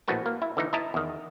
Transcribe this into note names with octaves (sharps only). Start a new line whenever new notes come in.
A#1 A2 F#4 B4 A5
A#3
E4
D3 E3 D#4
E4 D#5 A5 A#5
E2 D#3